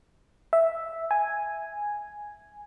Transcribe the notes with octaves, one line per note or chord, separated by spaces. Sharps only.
E5
G#5